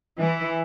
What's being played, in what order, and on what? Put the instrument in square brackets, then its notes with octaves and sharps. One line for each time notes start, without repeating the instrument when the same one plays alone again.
[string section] E3